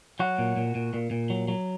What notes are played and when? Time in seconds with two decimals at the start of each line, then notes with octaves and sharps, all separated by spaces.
0.20 F#3 F#4
0.38 A#2
0.56 A#2
0.75 A#2
0.94 A#2
1.11 A#2
1.30 F#3
1.48 F#3